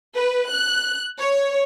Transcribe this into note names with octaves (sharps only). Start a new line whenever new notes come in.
B4
F#6
C#5